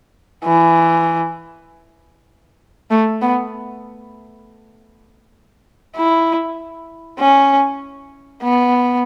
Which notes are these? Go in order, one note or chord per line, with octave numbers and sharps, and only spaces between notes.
E3
A3
B3
E4
C#4
B3